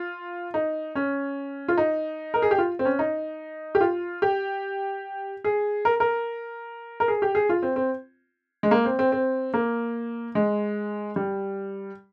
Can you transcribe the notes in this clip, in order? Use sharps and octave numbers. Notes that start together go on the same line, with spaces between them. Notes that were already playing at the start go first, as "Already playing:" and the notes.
Already playing: F4
D#4
C#4
F4
D#4
A#4
G#4
G4
F4
C4
C#4
D#4
G4
F4
G4
G#4
A#4
A#4
A#4
G#4
G4
G#4
F4
C4
C4
G#3
A#3
C4
C4
C4
A#3
G#3
G3